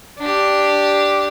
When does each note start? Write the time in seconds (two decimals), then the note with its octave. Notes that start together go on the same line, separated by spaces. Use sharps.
0.19 D4 G4